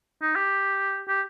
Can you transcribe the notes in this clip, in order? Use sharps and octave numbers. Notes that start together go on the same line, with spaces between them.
D#4
G4
G4